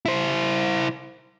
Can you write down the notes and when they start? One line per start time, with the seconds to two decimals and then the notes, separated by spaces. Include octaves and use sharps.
0.06 E4 C5